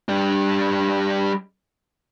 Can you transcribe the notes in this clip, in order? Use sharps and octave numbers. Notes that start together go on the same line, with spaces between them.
G3 D4